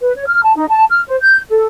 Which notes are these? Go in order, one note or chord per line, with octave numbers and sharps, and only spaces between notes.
B4
C#5
F6
A5
D#4
A5
F6
C5
G6
A4